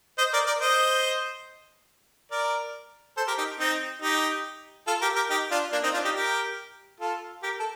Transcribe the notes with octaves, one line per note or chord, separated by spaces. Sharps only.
C5 D#5
A#4 D5
A#4 D5
C5 D#5
A#4 D5
A4 C5
G4 A#4
D#4 G4
C4 D#4
D#4 G4
F4 A4
G4 A#4
G4 A#4
D#4 G4
D4 F4
A#3 D4
C4 D#4
D4 F4
D#4 G4
G4 A#4
F4 A4
G4 A#4
A4